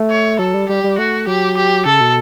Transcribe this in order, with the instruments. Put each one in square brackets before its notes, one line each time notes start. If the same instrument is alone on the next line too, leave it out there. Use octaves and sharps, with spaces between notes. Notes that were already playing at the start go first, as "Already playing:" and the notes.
Already playing: [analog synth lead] A3
[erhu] C#5
[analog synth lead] F#3 [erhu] A4
[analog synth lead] G3
[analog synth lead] G3 [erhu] G4
[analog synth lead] G3
[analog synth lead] A3 [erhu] F#4
[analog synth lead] F#3 [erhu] G4
[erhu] G4
[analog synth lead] C#3 [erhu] A4
[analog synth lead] B2